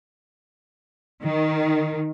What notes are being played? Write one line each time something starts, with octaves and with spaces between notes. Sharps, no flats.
D#3